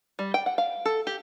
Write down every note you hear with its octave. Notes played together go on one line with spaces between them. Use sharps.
G3
G5
F#5
F5
A4
G4